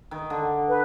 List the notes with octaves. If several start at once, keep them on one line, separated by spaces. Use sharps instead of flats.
D#3
D3
B4